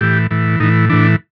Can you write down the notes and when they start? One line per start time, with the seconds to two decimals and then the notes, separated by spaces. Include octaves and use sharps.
0.01 A2 E3 G4
0.31 A2 E3
0.60 A2 E3 D#4
0.89 A2 E3 D4